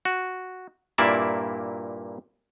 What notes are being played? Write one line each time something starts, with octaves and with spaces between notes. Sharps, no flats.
F#4
G2 A#2 A#3 E4 D5 E5